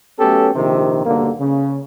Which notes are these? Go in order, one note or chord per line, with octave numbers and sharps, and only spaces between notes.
F#3 A3 B3 C#4 G4 A4
A#1 C3 D#3
B1 G2 D3 A#3
C#3